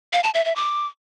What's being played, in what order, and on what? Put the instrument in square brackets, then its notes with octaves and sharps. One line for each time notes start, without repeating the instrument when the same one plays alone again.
[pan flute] F5
A5
E5
E5
D6